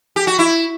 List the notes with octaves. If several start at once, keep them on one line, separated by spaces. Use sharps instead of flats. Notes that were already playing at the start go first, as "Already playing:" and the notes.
G4
F#4
E4